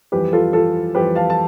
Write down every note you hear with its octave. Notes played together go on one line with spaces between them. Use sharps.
F2 E3 G3 G4 B4
F4 A4
F4 A4
F2 E3 G3 G4 B4
F5 A5
A5